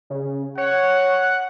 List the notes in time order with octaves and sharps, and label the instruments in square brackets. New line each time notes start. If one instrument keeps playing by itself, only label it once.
[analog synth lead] C#3
[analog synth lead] C#5 [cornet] F#5